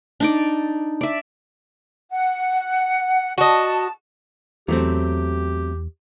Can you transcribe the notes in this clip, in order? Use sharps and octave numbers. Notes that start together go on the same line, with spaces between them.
D4 D#4 D5
D5 E5
F#5
F#4 D#5 A5
E2 F#3 A3 C4 G4